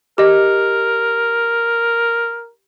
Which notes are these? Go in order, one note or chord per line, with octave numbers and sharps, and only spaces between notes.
G4 A#4 D#5